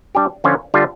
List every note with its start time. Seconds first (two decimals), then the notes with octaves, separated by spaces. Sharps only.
0.15 G3 D4 G4
0.44 D3 F3 C#4 F4 C#5
0.74 D3 G3 D4 F4